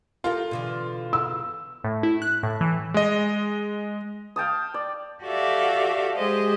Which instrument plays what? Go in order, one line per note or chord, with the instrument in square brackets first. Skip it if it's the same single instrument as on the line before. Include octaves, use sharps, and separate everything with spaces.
[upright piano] F4 [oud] G4 A4 A#4
[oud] B2 D3 E3
[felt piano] E6
[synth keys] A2
E4
F#6
A2
E3
[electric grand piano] G#3 D#5
[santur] F5 G5 A5 D#6
D5
[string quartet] F#4 G4 A4 D5 E5 F5
G#3 G4 G#4 C5 D#5